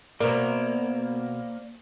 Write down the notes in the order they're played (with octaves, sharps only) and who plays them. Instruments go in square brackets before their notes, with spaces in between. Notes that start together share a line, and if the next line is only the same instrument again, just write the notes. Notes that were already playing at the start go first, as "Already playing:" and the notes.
[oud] B2 A#4 [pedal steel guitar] A#3 [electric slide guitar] C5 D5